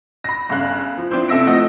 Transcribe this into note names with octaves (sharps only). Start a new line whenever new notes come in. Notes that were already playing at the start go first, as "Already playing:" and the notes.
B5 A#6
G1 C#3 F5 F#6
F3
F3 C4 D4 E4 C5
C3 A4 E5 E6 A#6 D7
F3 A3 D#5 F#5 A#6